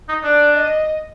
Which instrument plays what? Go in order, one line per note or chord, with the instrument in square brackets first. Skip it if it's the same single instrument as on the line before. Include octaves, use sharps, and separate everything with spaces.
[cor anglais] D#4
[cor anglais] D4 [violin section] D5
[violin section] D#5